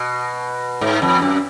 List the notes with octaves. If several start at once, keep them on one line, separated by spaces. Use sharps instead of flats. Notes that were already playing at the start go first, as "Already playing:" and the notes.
Already playing: B2
G#2
F2
F#2